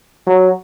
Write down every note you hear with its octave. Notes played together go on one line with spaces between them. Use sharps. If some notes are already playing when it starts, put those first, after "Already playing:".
F#3